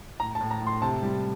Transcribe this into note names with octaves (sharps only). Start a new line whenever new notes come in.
A2 A#5
A5
A2
A#5
A2
C6
C3 A5
G3